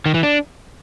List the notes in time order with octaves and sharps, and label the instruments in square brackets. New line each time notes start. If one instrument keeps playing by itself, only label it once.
[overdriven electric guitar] D#3
E3
D4